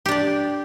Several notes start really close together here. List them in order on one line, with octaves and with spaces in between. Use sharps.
G4 D4 D5